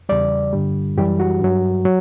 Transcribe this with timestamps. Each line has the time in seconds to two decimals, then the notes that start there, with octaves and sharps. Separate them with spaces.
0.09 E2 C#3 G3 D5
0.53 G2 D3 G3
0.97 F#2 E3 G3 G4
1.20 F#4
1.41 G2 F#3
1.85 F#3